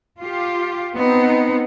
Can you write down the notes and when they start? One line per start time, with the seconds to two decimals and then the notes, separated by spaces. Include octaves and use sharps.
0.21 F4 G4
0.94 B3 C4 D#4